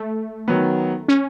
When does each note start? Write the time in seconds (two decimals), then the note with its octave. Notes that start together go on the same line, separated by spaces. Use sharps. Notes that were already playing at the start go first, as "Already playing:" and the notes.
Already playing: A3
0.48 D#3 F#3 B3
1.08 C#4